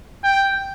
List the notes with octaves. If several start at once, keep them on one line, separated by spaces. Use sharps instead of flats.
G5